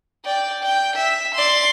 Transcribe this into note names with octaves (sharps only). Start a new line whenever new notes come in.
D5 G5
G5
E5
D5 C6